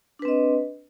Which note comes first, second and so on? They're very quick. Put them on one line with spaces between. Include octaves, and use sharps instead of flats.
D4 B4 C4 D#5